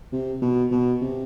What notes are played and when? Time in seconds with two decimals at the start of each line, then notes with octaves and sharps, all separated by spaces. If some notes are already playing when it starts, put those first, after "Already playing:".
0.13 C3
0.42 B2
0.72 B2
1.01 C3